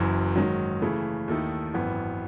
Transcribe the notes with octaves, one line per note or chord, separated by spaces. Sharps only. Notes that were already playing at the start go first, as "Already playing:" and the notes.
Already playing: F#1 F#2 E3
G#2 D#3 F#3
C#3 E3 A3
D#2 D#3 A3 E4 A4
G#1 F#2 E3 B3